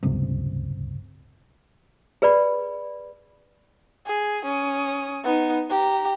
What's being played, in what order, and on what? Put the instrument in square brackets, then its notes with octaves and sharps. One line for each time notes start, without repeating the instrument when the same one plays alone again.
[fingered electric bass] D1 G1 C#2 C3
[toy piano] G#4 B4 D5 B5
[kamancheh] G#4
C#4 D#6
B3 D#4
G4 A#5